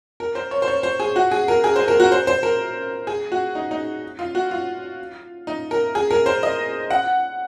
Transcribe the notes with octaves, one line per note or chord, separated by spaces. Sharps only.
A#4
C5
C#5
C5
C#5
C5
G#4
F#4
G#4
A#4
G#4
C5
A#4
F#4
C5
C5
A#4
G#4
F#4
D#4
D#4
F4
F#4
F4
D#4
A#4
G#4
A#4
C5
D#5
F#5